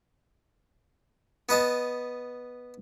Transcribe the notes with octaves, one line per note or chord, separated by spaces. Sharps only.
B3 B4 D#5 A5